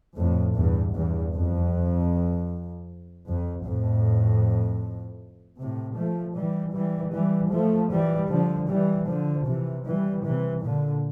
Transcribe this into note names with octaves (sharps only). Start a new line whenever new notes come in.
F2 A2
E2 G2
E2 G2
F2
F2
F2 A2
A2 C3
F3 A3
E3 G3
E3 G3
E3 G3
F3 A3
E3 G3
D3 F3
E3 G3
D3 F3
C3 E3
E3 G3
C3 E3
A#2 D3